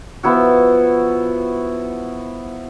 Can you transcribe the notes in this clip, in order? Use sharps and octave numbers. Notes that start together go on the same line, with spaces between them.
F3 B3 E4 F#4